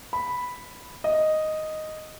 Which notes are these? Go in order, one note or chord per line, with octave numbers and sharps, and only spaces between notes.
B5
D#5